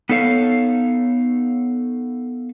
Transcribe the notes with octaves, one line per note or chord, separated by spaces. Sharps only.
B3 D#4 A4 C#5 F5